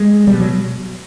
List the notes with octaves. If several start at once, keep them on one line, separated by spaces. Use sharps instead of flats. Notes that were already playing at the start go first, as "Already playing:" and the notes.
Already playing: G#3
B2 G3
F#3